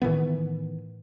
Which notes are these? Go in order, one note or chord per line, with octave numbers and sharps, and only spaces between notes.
A2 D#3 E3 B3